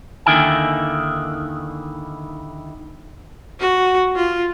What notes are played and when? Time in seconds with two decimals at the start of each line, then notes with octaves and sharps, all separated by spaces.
0.26 D#2 D3 D#3 E4 G5 G#5
3.60 F#4
4.16 F4